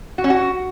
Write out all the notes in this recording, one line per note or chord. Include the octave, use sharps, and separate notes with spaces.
F#4
C#4
F#4